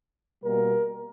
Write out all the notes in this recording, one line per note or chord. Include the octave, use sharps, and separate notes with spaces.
B2 G3 A#3 A#4